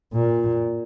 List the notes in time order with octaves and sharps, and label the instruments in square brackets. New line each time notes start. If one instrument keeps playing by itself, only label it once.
[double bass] A#2